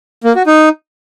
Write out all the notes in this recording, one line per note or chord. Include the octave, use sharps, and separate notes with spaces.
A#3
F#4
D#4